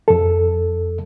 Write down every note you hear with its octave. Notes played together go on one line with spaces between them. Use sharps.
F2 A4